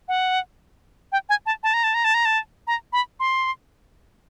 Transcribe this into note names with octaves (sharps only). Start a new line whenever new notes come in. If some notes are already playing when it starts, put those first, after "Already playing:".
F#5
G5
G#5
A5
A5
A#5
A5
A#5
A5
A#5
A5
A#5
B5
C6